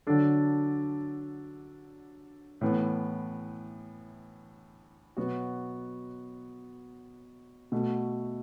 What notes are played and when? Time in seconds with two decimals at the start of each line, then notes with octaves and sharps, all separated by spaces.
0.07 D3 F#3 D4 A4
2.61 A2 E3 B3
5.17 B2 F#3 B3 F#4
7.72 B2 A3 F#4